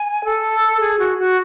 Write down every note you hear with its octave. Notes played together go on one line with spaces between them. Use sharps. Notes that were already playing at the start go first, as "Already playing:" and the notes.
Already playing: G#5
A4
G#4
F#4
F#4